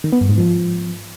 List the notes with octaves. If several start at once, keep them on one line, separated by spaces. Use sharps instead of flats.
D#3
B3
G2
G#2
F3